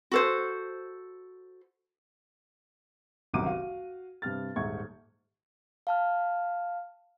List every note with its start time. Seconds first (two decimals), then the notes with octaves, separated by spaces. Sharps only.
0.12 F#4 A4 C5
3.34 G1 C2 F#2 D#3 D6 D#7
3.46 F#4 F5
4.22 G2 C3 F6 A6
4.56 D#1 G#2 E5 C#6 G#6
5.87 F5 A5 F6